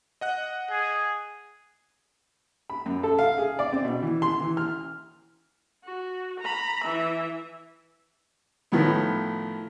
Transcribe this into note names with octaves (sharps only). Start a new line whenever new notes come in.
D#5 F#5 F#6
G#4
B5
F#2
A4
F5
G#4
D5
C4
B2
E3
C6
E3
F6
F#4
A#5 B5
E3 E5
A2 D#3 F3 B3